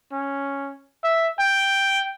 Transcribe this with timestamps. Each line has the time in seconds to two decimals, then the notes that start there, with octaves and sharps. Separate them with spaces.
0.12 C#4
1.04 E5
1.39 G5